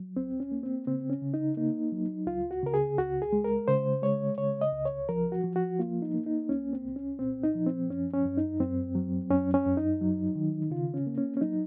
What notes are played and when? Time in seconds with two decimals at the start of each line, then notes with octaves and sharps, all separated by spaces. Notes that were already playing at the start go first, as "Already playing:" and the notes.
Already playing: F#3
0.16 C#2 C4
0.40 C#4
0.52 A#3
0.63 C4
0.87 C#3 C4
1.10 C#4
1.22 C#3
1.34 D#4
1.57 A#3 D#4
1.92 F#3
2.27 C#2 F4
2.51 F#4
2.63 C#3 A#4
2.74 G#4
2.98 C#2 F#4
3.22 G#4
3.33 G#3
3.44 A#4
3.68 C#3 C5
4.03 G#3 C#5
4.38 C#3 C#5
4.61 D#5
4.73 C#2
4.85 C#5
5.09 F3 A#4
5.32 F#4
5.44 F3
5.56 F#4
5.79 A#3 F4
6.02 D#4
6.14 A#3
6.26 D#4
6.49 C2 C#4
6.73 C4
6.85 C2
6.96 C#4
7.19 A#2 C4
7.43 D#4
7.55 F3
7.66 C4
7.90 F#2 C#4
8.13 C#4
8.25 F#2
8.37 D#4
8.60 F#2 C4
8.95 F#3
9.30 F#2 C#4
9.54 C#4
9.66 F#2
9.77 D#4
10.01 F#3
10.35 D#3
10.70 C#3 F4
10.94 C#4
11.07 A#3
11.18 C#4
11.37 C#4
11.41 F#3 D#4